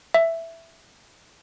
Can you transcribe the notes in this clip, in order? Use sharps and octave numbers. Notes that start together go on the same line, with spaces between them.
E5